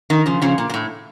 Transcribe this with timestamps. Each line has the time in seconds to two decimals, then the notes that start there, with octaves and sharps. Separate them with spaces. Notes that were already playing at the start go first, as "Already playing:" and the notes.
0.10 D#3
0.26 C#3 F3
0.42 C#3 F3
0.58 A#2
0.69 A#2
0.74 A2